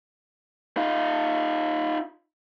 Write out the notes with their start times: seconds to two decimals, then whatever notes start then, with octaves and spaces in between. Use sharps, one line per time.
0.77 D#4 F4